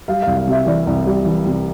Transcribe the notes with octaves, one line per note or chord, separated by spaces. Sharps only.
G3 F5
C2 F5
F5
C3 E5
E3 D5
C2
G3
E3
C3